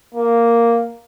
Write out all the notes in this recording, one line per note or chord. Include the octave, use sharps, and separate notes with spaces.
A#3